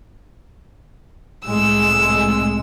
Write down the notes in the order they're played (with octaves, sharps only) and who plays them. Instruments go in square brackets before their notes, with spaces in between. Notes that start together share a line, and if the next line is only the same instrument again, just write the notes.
[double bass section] C2 A2 G#3 [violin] E6